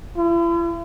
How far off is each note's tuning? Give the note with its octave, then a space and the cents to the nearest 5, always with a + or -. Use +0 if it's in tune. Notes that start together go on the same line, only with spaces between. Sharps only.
E4 +45